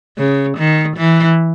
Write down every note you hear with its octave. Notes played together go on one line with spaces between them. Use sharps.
C#3
D#3
E3